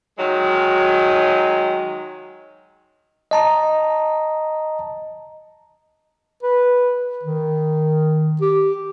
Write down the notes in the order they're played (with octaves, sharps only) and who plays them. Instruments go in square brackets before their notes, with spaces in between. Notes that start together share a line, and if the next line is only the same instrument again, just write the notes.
[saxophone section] D#3 F#3 G#3
[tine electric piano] D#5 A5 A#5
[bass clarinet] B4
D#3
G4